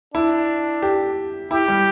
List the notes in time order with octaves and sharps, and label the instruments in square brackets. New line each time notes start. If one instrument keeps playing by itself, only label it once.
[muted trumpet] D4 [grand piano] E4
[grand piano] G4
[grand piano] E4 [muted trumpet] G4
[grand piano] G3